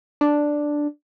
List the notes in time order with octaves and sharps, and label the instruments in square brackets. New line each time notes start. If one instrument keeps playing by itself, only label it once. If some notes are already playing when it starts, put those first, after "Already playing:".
[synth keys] D4